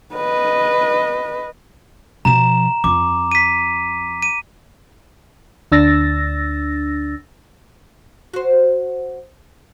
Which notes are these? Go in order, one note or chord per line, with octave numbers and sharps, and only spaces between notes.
B4 D#5
B2 F3 A#5 E7
F2 D6
B6 D#7
D#7
D2 D4 E6 A6 A#6
F#4 C5